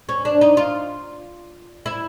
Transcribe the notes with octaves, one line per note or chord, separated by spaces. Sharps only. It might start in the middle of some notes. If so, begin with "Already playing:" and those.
C#4
D4
D#4
F4
E4